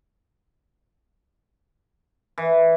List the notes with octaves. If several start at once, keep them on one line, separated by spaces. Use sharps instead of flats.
E3